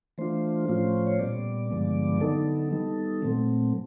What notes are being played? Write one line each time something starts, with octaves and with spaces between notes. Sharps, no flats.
E3 A3 D4 F4 C5
A2 F3 A3 C#4 F4
C#5
A#2 G3 B3 D5
G2 D3 F3 G#3 B3
D3 F#3 B3 D#4 A4
D#3 G3 B3 D#4
A#2 F#3 A3 C4